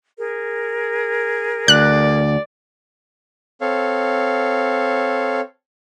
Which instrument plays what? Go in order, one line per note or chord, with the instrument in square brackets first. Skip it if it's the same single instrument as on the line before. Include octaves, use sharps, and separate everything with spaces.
[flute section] G#4 A#4
[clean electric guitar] D2 [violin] D5 [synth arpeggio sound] F#6
[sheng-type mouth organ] C4 A4 C#5 F5